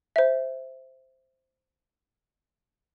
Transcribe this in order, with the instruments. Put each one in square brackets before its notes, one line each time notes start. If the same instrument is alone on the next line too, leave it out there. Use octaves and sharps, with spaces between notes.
[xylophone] C5 E5